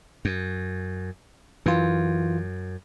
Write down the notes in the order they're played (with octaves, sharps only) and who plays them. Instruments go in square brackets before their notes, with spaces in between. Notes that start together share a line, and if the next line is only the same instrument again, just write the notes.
[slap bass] F#2
[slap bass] F#2 [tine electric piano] E3 F4